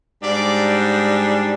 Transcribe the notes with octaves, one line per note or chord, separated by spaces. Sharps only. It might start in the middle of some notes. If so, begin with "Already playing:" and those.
G#2 G3 D4 D5